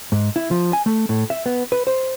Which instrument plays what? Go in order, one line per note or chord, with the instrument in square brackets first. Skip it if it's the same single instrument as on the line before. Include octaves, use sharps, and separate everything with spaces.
[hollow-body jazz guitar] G#2
E4
F3
G#5
A3
A2
E5
B3
B4
C5